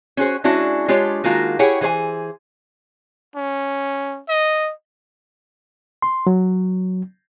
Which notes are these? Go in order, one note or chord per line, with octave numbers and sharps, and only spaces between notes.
C#4 F#4 G#4 C5
G#3 C#4 D4 E4 F#4
G#3 D4 F4 G4 C#5
D#3 G#3 A#3 F4 F#4
E4 G4 G#4 C#5 F#5 G5
E3 G#4 C5 C#5 G#5
C#4
D#5
C6
F#3